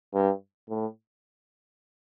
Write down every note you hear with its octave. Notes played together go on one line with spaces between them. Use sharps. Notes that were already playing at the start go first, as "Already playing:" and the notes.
G2
A2